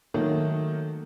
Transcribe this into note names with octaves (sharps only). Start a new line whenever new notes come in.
D#3 F#3 A3 A#3